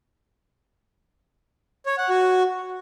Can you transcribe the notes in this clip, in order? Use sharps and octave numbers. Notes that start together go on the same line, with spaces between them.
C#5
F#5
F#4